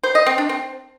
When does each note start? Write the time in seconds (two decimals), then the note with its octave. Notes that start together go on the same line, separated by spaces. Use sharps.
0.04 C5
0.15 D#5
0.26 C4
0.38 D4
0.49 C4